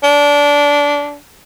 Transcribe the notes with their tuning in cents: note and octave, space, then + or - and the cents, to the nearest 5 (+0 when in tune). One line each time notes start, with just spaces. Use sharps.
D4 -20